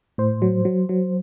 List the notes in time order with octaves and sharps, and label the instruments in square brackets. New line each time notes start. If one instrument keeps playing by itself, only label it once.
[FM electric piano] A2 C5
F#3
F#3
F#3